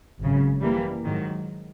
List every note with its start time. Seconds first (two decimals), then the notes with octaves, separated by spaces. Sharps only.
0.21 G#1 F#2 C#3
0.62 E3 G3 A#3
1.04 G#2 D#3 F#3